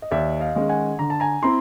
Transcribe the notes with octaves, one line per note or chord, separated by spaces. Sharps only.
D#5
D#2 D5 E5
D#5 F5
D#3 G#3 C#4
F#5 G#5
D3 A#5
A5
G#5 A#5
C4 E4 A#5 C6